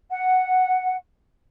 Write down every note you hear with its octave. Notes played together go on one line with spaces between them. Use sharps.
F#5